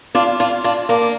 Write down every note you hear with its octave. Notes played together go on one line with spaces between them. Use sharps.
D4 F4
D4 F4
D4 F4
A#3 D4